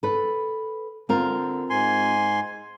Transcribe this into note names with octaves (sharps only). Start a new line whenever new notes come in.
A4 B4
D3 C4 F4 A#4
G#2 G#5 C6